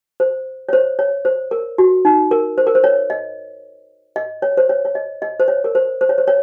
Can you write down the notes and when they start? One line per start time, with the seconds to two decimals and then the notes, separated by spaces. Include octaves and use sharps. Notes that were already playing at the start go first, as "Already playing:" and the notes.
0.20 C5
0.69 C#5
0.73 C5
0.99 C#5
1.25 C5
1.51 A#4
1.78 F#4
2.05 D#4
2.31 A#4
2.58 C5
2.67 A#4
2.75 C5
2.84 C#5
3.10 D#5
4.16 D#5
4.42 C#5
4.57 C5
4.69 C#5
4.85 C#5
4.95 D#5
5.22 D#5
5.40 C5
5.48 C#5
5.64 A#4
5.75 C5
6.01 C5
6.09 C#5
6.18 C5
6.28 C#5